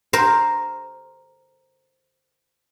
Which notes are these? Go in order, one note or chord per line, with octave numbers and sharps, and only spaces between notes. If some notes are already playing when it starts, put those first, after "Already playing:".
A#4 C5